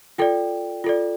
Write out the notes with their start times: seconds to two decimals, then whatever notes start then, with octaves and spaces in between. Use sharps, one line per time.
0.18 F4 A4 D5 G5
0.84 F4 A4 D5